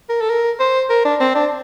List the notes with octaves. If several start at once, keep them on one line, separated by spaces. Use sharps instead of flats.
A#4
A4
A#4
C5
A#4
D4
C4
D4